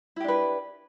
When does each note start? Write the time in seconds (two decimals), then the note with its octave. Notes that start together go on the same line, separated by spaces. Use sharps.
0.16 E4
0.20 G4
0.24 D4
0.28 B4